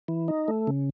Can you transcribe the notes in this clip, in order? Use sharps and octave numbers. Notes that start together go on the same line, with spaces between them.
E3
D#4
A3
C#3